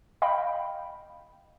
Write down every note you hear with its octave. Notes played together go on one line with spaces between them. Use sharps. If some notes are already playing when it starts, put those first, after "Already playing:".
D#5 F5 G5 B5